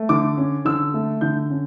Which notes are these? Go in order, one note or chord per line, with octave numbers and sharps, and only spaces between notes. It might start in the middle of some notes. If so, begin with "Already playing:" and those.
Already playing: A3
D3 D6
C#4
D3 E6
A3
D3 G6
C#4